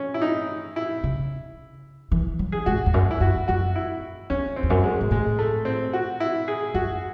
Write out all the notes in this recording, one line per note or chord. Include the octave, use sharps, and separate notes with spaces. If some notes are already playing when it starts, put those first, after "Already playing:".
Already playing: C#4
E4
D#4
E4
C#3
E3
F#3
G#4
G#2 F#4
E2
F#2
E4
F#2 F#4
F#2 F#4
E4
E2 C#4
C4
E2
F#2
G#3
G#2
A2 G#3
A3
C4
F#4
E4
G#4
F#2 F#4